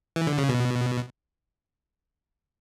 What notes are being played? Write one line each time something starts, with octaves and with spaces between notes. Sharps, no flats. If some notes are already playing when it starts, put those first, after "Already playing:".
E3
D3
C#3
B2